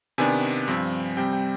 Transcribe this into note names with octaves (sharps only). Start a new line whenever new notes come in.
C3 D#3 B3 D4 G#5
G2 F3 C4
C3 G3 C4 G5
G5